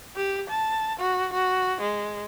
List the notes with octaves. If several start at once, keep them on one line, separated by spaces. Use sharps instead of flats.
G4
A5
F#4
F#4
G#3